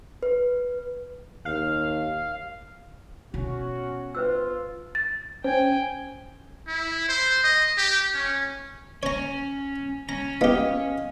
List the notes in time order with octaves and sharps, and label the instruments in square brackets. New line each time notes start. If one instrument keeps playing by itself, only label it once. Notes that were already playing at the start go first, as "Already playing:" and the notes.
[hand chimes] B4
[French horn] D#2 [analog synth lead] F5
[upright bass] B2 [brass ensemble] C#4 F#4
[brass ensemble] F4 [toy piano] B4 C5 E6
[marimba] A6
[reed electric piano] C#4 [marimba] C5 [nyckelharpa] G5 G#5
[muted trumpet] E4
C5
D#5
G4
C#4
[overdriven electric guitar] C#4 [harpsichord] C#5 A#5
[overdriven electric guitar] C#4 [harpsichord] A#5
[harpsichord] B3 G4 [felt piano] D#5 F5